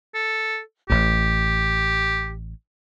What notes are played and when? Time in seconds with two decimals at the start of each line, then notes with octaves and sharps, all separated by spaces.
0.14 A4
0.90 A1 A2 G4